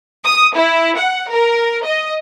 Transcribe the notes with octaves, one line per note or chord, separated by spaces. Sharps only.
D#6
E4
F#5
A#4
D#5